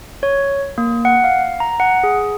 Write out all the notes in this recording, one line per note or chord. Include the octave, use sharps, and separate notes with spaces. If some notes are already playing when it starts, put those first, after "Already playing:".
C#5
A#3
F#5
F5
A#5
F#5
G#4